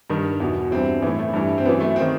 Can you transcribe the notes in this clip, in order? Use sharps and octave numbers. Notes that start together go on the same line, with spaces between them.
G2 D#3
E2 B2
G2 E3 C4
A2 E3 B3
A3
G2 E3
C4
F#2 E3 B3
A3
C4
D#3